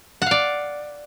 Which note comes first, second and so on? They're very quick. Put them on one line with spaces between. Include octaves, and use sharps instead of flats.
F#5 F5 D5